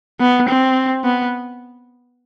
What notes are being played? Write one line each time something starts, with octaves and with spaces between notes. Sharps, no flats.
B3
C4
B3